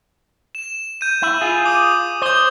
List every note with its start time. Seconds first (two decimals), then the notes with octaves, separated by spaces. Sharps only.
0.55 E7
1.01 G6 D#7
1.22 E4
1.41 F4 G#4
1.66 D6 D#6 D#7
2.22 C5 D#6 G6